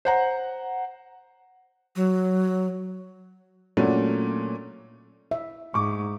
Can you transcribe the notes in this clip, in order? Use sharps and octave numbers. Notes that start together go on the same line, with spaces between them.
C5 F#5 A#5
F#3
A#2 F#3 A3 C#4 D4
E5
G#2 C#6 D6